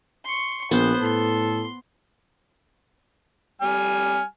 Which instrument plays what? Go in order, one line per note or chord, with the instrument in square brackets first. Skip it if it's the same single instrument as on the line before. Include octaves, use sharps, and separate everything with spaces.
[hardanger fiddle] C6 C#6
[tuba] A#1 [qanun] B3 [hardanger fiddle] C5
[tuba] A2 [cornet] A4 [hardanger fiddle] C6
[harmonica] G3 G#5 F6